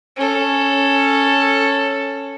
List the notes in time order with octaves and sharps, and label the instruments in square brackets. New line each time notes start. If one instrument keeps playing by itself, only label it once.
[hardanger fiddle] C#4 A4